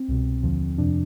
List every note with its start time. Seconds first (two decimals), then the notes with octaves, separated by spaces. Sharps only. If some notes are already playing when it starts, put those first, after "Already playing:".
Already playing: C4
0.08 C2 B2
0.43 D#2 D3 F3
0.78 F2 C3 F3 D4